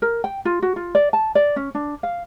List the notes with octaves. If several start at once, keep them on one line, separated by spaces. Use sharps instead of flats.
A#4
G5
F4
F#4
F4
D5
A5
D5
C#4
D4
F5